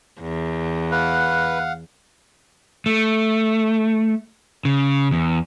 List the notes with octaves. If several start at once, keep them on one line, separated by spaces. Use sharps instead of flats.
E2
B4 F5 F#5
A3
C#3
E2